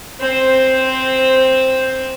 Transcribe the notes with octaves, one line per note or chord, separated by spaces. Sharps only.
C4 C5